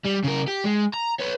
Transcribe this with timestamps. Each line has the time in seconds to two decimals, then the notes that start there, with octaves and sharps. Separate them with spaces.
0.06 G3
0.24 C#3 A#4
0.48 G4
0.65 G#3
0.94 A#5
1.20 B4 C#5